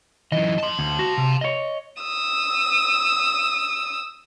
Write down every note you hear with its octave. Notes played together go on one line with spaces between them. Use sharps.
F#2 E3 D#5
A5 C6
D2
F#4
C3
C#5 D#5
D#6 E6